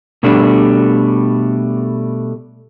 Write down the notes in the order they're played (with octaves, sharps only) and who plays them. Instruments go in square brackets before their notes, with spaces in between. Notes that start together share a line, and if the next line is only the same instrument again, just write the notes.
[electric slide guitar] B2 G3 A3 D4